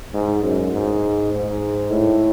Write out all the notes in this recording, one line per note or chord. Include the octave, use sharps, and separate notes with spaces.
G#2
F#2
G#2
G#2
A2